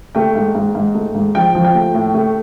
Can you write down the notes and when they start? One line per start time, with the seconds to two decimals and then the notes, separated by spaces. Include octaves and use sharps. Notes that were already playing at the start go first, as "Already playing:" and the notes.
0.15 A3 G5
0.35 G#2
0.55 G#2
0.75 G#2
0.94 A3
1.15 G#2
1.35 F3 G5
1.55 F3
1.65 G5
1.75 A3
1.94 A2
2.14 A3